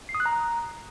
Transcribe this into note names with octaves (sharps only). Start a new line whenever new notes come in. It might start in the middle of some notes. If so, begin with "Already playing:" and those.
C7
D#6
F#6
A#5